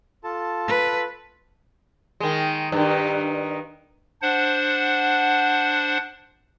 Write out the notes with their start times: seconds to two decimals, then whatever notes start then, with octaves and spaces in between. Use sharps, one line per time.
0.24 F4 A4 A5
0.68 B4
2.20 D#3 G#3
2.72 G2 D#3
4.22 D4 C5 F#5